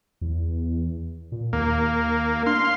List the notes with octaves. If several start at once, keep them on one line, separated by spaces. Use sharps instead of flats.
E2
A#2
D#2 A#3
D4 F5 C6